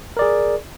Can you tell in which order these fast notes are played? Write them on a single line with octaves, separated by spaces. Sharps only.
A#4 D5 G#4